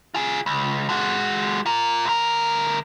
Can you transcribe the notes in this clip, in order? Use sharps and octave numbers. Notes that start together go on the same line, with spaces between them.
F4 G#4
C#2
G#3 F#4
F4 A#4
D2 A#4